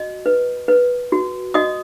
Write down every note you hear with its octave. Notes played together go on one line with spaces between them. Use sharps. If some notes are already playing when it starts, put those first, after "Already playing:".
Already playing: F#4 D#5
B4
B4
F#4
F#4 D#5 D#6